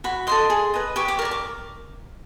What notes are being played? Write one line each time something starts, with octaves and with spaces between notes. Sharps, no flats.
F#4 B5
A4 C5 D#5 C6
G#4
B4 D#5
G4 C#6
D6
A#4 D5 D6
C#6
D6